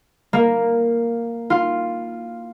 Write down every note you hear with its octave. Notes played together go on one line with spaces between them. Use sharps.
A#3
F4